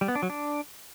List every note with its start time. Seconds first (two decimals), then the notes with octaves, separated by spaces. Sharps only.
0.01 G3
0.08 B3
0.15 D4
0.23 F#3
0.30 D4